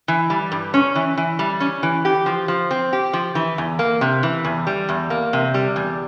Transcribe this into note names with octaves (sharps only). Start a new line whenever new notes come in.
E3
G3
G2
C#4
E3
E3
G3
C#4
E3
G4
F3
F3
C4
G4
F3
E3
E2
A#3
C3
E3
E2
G3
E2
A#3
C3
G3
E2